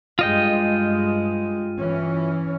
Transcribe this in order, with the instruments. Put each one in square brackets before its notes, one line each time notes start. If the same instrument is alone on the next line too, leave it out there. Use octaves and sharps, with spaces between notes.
[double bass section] G2 G#3 [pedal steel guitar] F4 D#5 G5
[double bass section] E3 C#4